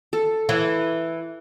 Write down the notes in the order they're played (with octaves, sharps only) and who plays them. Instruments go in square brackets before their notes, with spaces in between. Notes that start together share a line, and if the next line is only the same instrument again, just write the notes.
[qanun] A4
[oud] E3